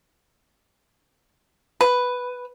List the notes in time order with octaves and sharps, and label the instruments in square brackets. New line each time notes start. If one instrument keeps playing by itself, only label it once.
[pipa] B4